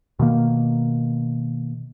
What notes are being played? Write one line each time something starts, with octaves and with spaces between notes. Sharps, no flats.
B2 D#3 A#3